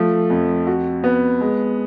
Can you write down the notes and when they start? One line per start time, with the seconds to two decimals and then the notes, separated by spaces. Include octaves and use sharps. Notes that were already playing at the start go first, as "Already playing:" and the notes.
Already playing: F3 A3
0.30 F2
0.67 F#4
1.04 B3
1.41 G#3